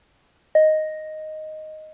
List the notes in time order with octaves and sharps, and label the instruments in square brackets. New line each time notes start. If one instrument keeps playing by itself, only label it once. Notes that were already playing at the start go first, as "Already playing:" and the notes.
[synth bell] D#5